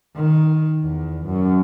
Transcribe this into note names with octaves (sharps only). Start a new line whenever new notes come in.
D#3
E2
F#2